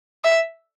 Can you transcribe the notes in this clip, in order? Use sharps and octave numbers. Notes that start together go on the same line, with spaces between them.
E5